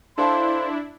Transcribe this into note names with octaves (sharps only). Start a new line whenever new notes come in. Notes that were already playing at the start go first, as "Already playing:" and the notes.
D4 E4 A4 C5 F5 A5 C6